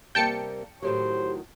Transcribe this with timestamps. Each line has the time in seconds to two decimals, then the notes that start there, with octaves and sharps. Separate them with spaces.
0.15 C3 G3 A#3 G5 A5 C#7
0.83 A2 D#3 F#3 G4 C5